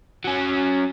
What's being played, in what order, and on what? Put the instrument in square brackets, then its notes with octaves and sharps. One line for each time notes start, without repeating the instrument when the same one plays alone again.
[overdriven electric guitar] F#3 C#4